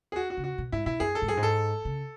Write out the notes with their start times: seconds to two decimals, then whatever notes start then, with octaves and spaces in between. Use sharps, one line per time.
0.12 G#4
0.16 F#4
0.30 F#4
0.37 C#3
0.44 F#4
0.58 B2
0.72 G#2 E4
0.86 B2 E4
1.00 F#2 G#4
1.15 A4
1.22 G#2
1.28 F#2 G#4
1.37 G#2
1.43 A4
1.85 C#3